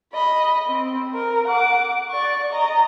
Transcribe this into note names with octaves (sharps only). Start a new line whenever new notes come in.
D#5 B5
C4
A#4
F#5 D6
D5 C#6
D#5 A#5